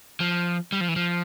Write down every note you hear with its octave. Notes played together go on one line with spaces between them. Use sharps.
F3
G3
F3
E3
F3